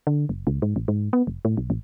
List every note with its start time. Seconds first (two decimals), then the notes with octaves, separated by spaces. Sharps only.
0.07 D3
0.29 F#1
0.47 C#2
0.62 G#2
0.76 A1
0.88 G#2
1.13 B3
1.27 F1
1.45 A2
1.57 B1
1.70 A1